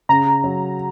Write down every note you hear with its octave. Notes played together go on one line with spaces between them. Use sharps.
C#3 A#5
F#3